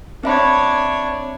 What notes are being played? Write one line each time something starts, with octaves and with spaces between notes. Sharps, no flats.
C4 D4 C#5 E5 B5